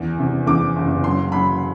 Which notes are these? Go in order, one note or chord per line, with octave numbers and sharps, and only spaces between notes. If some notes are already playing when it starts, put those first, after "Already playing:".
Already playing: E2
C3
E2 D6
F#1
F#3 C6
F#3 B5